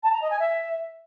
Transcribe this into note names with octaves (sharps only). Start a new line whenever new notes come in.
A5
A#5
D#5
G#5
E5